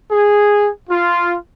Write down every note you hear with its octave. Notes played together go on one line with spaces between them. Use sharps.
G#4
F4